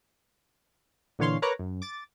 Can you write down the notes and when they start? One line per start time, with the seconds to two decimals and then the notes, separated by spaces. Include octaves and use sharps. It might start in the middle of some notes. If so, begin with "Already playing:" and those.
1.19 A#2 D3 E3 C#5 F5 C6
1.42 A#4 B4 C#5 A#5 D6 F#6
1.59 F#2
1.82 D6 A6